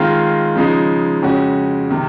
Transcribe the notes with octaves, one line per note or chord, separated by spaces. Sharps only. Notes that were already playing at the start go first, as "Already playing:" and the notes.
Already playing: D#3 G#3 C4 F4
C#3 F3 G#3 D#4
F2 C#3 G#3 C#4 F#4
C3 D#3